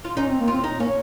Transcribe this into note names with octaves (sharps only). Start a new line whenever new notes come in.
F4
C#4 D#4
C4
A#3
C4 F4
D#4
A#3 C#4